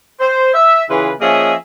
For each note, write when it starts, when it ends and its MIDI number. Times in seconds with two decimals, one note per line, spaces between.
0.20 0.51 72
0.54 0.83 76
0.89 1.12 49
0.89 1.12 52
0.89 1.12 65
0.89 1.12 68
0.89 1.12 71
1.21 1.54 53
1.21 1.54 58
1.21 1.54 61
1.21 1.54 68
1.21 1.54 75
1.21 1.54 76